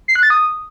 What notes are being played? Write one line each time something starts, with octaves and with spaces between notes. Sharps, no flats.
C7
F#6
A6
D#6